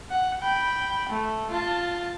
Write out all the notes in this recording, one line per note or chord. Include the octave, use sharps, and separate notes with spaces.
F#5
G5 B5
A3
F4 A5